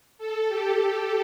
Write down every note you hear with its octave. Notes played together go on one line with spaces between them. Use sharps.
A4
G4
A4